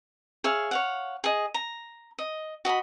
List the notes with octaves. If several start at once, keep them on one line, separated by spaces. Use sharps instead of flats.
G#4 C#5 E5 F5
C#5 F5 F#5
G#4 D#5
A#5
D#5
F#4 D#5 A5 B5